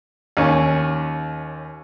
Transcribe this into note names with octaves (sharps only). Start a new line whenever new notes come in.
D#2 C#4